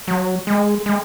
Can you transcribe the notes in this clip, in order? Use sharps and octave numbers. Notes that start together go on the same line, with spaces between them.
F#3
G#3
G#3